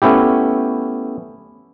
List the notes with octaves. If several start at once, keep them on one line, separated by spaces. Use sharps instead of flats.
A3 B3 C#4 E4 G4